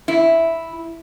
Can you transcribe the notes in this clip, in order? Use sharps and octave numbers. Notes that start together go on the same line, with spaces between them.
E4